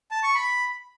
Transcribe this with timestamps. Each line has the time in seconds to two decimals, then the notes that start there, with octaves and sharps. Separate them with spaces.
0.11 A5
0.23 C#6
0.35 B5